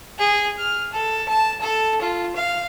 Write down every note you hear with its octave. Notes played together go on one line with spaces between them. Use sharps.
G#4
F6
A4
A5
A4
F4
F5